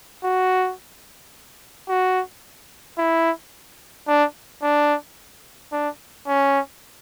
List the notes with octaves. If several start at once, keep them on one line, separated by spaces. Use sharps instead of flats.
F#4
F#4
E4
D4
D4
D4
C#4